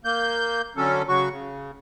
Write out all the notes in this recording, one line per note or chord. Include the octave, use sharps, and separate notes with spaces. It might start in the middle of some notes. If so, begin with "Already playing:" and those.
A#3 G6
D3 F#3 C#4 A4
C#3 F#3 F#4 C#6
C#3